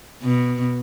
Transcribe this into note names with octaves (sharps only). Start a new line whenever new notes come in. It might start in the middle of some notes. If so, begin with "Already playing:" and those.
B2